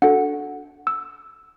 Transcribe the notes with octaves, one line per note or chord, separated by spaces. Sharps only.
D4 F#4 A4 F#5
E6